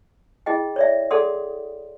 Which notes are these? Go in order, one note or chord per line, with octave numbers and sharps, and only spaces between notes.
E4 G#4 D#5 G5
C#5 D5 E5
G#4 A4 D5 F#5 C6 D#6